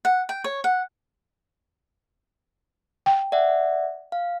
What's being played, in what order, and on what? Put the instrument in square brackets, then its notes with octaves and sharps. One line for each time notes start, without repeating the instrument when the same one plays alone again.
[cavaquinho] F#5
G5
C#5
F#5
[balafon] G5
[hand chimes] D5 E5 F#5
F5